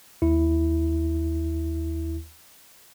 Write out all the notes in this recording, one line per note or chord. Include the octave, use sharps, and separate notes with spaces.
D#2 E4